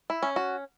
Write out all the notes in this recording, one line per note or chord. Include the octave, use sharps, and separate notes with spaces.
E4
C#4
F#4